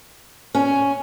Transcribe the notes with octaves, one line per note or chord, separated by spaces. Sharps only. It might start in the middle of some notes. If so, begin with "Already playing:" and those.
C#4